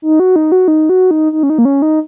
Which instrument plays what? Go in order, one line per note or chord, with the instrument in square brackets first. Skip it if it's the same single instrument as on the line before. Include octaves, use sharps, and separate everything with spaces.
[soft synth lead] D#4
F#4
D#4
F#4
D#4
F#4
D#4
D#4
C#4
D#4
A#3
C#4
D#4